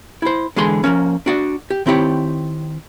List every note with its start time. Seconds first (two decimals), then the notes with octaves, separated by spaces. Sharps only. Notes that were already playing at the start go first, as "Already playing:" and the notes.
0.22 E4 C5
0.56 D3 E3 G#3 G#4 C6
0.84 F3 A3 A#3 C#4
1.26 D4 F#4 D5
1.70 G4
1.86 D#3 C4 E4 G4 C#5